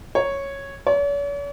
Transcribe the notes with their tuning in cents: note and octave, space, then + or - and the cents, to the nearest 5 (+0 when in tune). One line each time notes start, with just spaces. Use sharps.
C#5 -5
C#5 +45